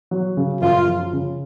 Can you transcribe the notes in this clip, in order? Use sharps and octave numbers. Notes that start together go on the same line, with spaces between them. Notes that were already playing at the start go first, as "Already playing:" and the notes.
F#3
C#3
F#2 F4
F3
C#3